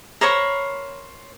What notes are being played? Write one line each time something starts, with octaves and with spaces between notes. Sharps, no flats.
A#4 C5 C#5 B5